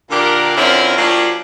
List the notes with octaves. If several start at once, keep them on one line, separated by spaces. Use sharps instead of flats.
A#2 D3 D4 G4 A#4
D3 C4 C#4 E4 F4 A#4
F3 A#3 D4 F#4 G4 C#5